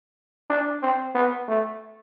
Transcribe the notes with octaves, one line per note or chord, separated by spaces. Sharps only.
D4
C4
B3
A3